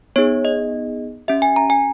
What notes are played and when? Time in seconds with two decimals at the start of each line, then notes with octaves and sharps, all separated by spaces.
0.16 B3 D#4 G#4 C#5
0.45 D#5
1.28 C#4 G4 E5
1.42 G#5
1.56 A#5
1.70 G#5